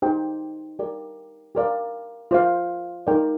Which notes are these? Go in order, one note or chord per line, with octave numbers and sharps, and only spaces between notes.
D#4 G4 C5 G5
G4 A#4 D5
G4 A#4 D5 F5
F4 C5 F5
D#4 A#4 D5 G5